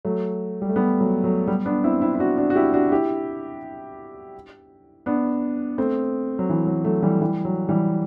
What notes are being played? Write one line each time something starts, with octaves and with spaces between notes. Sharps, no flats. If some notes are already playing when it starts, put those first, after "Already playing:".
F#3 A3
G3
A3
G3 B3
F#3 A3
F#3 A3
G3 B3
B3 D4
C4 E4
C4 E4
E4
D4 F#4
D4 F#4
F#4
E4 G4
D4 F#4
E4 G4
B3 D4
A3 C4
F#3
E3
F#3
F#3 A3
E3 G3
E3 G3
F#3
E3 G3